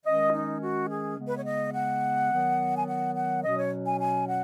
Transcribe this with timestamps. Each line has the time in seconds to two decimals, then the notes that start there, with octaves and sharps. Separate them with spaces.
0.05 D#3 G#3 C#4 D#5
0.34 D#4
0.61 F#4
0.90 G#4
1.18 C#3 G#3 B3
1.28 B4
1.37 C#5
1.46 D#5
1.74 F#5
2.32 D#3 F#3 B3
2.77 G#5
2.88 F#5
3.16 F#5
3.43 B2 F#3 C#4 D#5
3.58 C#5
3.86 G#5
4.01 G#5
4.28 F#5